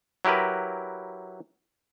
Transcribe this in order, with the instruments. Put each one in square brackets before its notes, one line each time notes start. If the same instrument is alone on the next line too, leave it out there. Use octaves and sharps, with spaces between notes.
[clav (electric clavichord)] F#3 E4 G4 A#4 B4